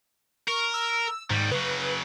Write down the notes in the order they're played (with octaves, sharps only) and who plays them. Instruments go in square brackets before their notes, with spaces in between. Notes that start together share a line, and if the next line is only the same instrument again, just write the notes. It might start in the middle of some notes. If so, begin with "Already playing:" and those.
[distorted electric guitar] A#4 [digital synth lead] C#6
[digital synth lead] E6
[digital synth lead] G#2 [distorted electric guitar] D#3 G3
[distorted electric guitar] C#3 F#3 [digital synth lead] B4